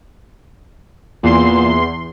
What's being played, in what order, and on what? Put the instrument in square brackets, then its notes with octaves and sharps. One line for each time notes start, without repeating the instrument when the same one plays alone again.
[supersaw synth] E2 C6 [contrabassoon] A#2